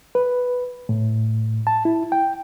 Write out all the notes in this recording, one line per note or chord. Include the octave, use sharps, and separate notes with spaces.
B4
A2
A5
E4
G5